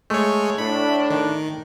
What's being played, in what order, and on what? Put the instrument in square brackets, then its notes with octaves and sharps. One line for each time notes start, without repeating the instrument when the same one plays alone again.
[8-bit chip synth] G#3 C#5 [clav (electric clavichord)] A3
[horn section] A2 D4 [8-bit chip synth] B5
[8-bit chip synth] D#3